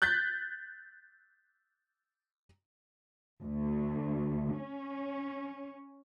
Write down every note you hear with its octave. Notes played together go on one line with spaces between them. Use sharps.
F#6 G6 A6 B6
D2
C#4